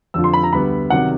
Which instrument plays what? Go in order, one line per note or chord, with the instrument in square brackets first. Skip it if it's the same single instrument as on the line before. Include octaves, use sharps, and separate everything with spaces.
[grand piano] F2 D3 F3 [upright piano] E6
[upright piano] C6
B5
A#5
[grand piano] D2 D3 G3 B3 [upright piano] B5
[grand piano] C3 D#3 F#3 [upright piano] F#5